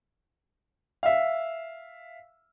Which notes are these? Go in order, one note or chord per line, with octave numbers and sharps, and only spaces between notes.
E5 F5